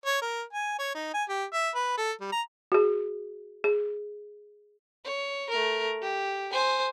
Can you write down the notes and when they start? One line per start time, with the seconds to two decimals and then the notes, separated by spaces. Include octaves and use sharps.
0.06 C#5
0.22 A#4
0.53 G#5
0.79 C#5
0.95 D#4
1.14 G#5
1.29 G4
1.54 E5
1.75 B4
1.98 A4
2.21 G3
2.32 A#5
2.72 F#4 G#4
3.64 G#4
5.05 C#5
5.50 A3 A#4
6.02 G4
6.52 C5 G#5